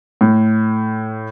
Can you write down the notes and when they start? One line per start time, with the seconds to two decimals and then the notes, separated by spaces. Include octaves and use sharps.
0.21 A2